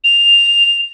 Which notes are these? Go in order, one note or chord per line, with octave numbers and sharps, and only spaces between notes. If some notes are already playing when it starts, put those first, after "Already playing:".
F7